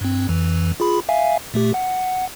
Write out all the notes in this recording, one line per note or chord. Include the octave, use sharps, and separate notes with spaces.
G2 C4
F2 E3
F4 G#4 B5
E5 F5 G#5
A#2 A3 G4
F#5